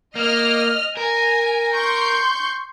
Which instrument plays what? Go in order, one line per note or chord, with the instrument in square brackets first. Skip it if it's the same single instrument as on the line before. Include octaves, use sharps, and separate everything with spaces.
[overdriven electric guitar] A#3 [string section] D#5 F6
[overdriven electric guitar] A#4 [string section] G#5
[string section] C6 C#6 G6